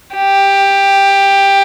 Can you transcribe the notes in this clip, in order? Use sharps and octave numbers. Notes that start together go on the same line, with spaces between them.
G4